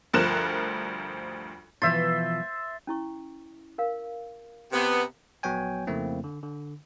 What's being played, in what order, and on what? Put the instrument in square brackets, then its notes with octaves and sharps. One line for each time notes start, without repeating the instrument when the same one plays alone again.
[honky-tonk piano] D2 G2 F3 A#4 F#6 E7
[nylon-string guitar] B2 E3 F3 [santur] C5 E5 [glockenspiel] A6
[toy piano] C#4 E4 C#6
A#4 F5
[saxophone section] C3 B3
[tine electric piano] A#1 F#3 B3 C#5 G5 G#5
F2 C#3 A3 A#3 C4 E4
D3
D3